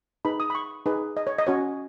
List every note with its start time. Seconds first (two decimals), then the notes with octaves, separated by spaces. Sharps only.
0.25 D#4 G#4 B4 B5
0.40 D#6
0.50 B5
0.55 C#6
0.86 D#4 G#4 B4
1.17 D#5
1.27 C#5
1.39 D#5
1.47 C#4 F#4 C#5